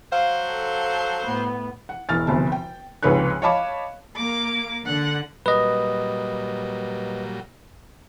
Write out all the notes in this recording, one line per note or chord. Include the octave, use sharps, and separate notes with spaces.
F#3 C5 F5
A4
A2 B3
F#5
E1 A1 F6 A6
F1 D2 B2 A5
G5
F1 C#2 G#2 B4 C#5 F#6
C#5 D#5 F5 A5 B5 D6
A#3 D6
D3 F#5
A#2 F#3 G3 B4 D#5